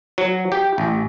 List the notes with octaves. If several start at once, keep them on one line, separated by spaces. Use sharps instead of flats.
F#3
G4
A1